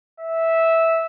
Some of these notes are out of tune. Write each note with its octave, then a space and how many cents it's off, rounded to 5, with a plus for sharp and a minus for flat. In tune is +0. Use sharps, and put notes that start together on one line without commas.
E5 -10